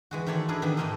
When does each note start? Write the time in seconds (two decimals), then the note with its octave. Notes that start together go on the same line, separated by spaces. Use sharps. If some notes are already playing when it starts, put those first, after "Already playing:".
0.11 E3 G#3 F#4
0.27 D#3 E3 A3 C#5 D5 C6
0.49 D4 E4 G#4 A#4 B4
0.62 D#3 E3 A#3 B3 D4
0.77 G#2 D#3 A3 A#3 F4 D#5